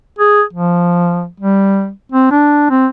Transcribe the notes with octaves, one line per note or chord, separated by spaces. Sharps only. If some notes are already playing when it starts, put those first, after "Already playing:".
G#4
F3
G3
C4
D4
C4